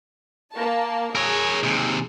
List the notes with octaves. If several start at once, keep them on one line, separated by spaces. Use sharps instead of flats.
A#3 A5
G#4 A#4 C#5
D#2 C3